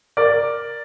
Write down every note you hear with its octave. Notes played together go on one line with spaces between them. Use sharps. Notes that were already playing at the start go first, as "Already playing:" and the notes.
A#4 D5